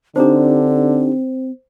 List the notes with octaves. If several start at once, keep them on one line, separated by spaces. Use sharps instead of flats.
D3 C4 D4 D#4 G4 C5